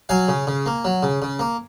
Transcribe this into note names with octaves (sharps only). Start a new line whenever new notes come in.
F#3 F5 G#5
C#3
C#3
A#3
F#3
C#3
C#3
A#3